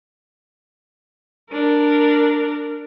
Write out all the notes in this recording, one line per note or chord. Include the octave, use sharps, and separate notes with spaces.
D4 A#4